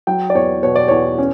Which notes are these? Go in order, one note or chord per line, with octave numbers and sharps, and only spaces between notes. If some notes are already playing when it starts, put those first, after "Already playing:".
F#3 G5
D5
E2 C#5
B2 C#5
D5
E2 C#5
C#4